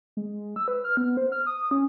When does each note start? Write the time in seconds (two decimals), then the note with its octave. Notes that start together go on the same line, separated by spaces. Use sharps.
0.17 G#3
0.56 E6
0.68 B4
0.84 F6
0.97 B3
1.17 C5
1.32 F6
1.46 D#6
1.71 C#4